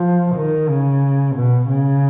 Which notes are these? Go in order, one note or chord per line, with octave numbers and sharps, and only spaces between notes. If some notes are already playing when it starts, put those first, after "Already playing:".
Already playing: F3
D#3
C#3
B2
C#3